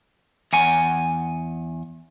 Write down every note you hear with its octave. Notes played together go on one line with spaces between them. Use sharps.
E2 F#5 G#5